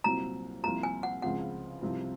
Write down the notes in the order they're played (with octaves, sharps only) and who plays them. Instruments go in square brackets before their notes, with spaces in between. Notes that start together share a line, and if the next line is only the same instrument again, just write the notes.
[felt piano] C2 A#2 F#3 C4 [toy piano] A#5
[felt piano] C2 C3 F3 A#3 F4 [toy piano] A#5
[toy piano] G#5
F#5
[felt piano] C#2 C#3 F3 C4 [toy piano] F#5
[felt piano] C2 C3 F3 C4